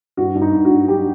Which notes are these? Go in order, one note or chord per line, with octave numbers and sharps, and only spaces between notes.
G2 F#4
G2
D#4
G2
F#4
G2
F#3 G4